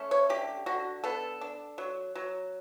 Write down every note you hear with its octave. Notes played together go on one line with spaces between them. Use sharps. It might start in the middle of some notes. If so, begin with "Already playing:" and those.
Already playing: A3 C#4
C#5
D3 G4
D3 F#4
B3 A4
D4
F#3
F#3